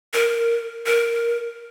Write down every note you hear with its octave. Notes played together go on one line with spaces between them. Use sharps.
A#4
A#4